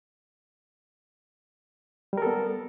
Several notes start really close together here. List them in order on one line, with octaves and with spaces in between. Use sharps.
G3 A#4 A4 B3